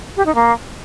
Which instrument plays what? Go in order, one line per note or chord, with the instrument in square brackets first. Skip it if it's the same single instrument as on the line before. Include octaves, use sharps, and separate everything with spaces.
[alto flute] G4
D#4
A#3